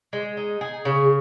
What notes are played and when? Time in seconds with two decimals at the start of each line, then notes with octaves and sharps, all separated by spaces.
0.13 G#3
0.37 D#4
0.61 G#4
0.85 C#3